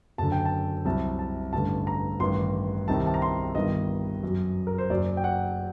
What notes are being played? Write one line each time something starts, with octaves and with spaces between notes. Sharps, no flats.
F#1 F#2 D3 A5
G5
A5
C2 C3 F#3 A5
A5
A1 G2 D3 A5
A#5
A1 G2 D#3 C6
C2 C3 D#3 A5
A5
A#5
C6
G1 G2 D#3 D#5
F#2 F#3
A#4
C5
F#1 F#2 F#3 D5
G5
F#5